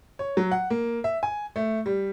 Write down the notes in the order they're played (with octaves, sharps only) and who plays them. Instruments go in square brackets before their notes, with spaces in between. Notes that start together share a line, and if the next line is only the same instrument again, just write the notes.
[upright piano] C#5
F#3
F#5
A#3
E5
G#5
A3
G3